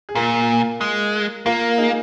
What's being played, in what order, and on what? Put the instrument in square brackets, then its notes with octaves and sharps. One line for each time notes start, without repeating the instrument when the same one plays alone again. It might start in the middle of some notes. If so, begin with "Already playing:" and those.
[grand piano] G#4
[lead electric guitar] A#2 [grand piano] F4 A#4
[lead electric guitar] G#3
[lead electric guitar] A#3 [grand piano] F4 A#4
[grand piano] D#4 G#4